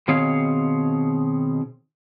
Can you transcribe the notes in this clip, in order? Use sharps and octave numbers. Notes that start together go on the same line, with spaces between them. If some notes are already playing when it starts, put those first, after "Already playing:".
B2 D#3 C4 G#4 C#5 F5